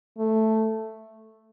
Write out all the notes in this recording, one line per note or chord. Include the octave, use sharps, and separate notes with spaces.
A3